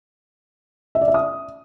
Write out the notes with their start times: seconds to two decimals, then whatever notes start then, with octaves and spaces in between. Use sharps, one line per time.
0.95 E5
1.01 D5
1.08 E5
1.14 D#6